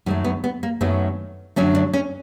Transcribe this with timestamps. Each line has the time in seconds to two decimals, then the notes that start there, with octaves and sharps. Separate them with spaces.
0.06 F#2 D#3 F#3 A3 B3
0.24 B3
0.44 B3
0.63 A#3
0.81 F#2 D#3 F#3 A3 B3
1.56 F#2 D3 F#3 A3 C#4
1.75 D4
1.94 C#4